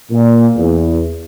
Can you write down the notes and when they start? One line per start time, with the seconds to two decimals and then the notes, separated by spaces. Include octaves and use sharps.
0.11 A#2
0.56 E2